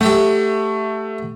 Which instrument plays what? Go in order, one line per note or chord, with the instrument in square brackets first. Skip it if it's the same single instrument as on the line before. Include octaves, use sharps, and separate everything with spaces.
[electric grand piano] A3 [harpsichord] G4 E5 F#5